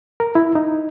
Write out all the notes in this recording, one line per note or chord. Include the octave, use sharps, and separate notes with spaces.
A#4
E4
D#4